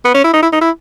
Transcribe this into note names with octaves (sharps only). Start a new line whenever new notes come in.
B3
C#4
E4
D#4
E4
D#4
E4